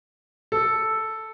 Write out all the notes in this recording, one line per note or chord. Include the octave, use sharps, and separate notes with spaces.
A4